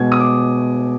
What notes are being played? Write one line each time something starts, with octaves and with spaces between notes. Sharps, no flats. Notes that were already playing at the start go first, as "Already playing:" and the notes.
Already playing: B2 G#3 B3 G#6
D#6
D6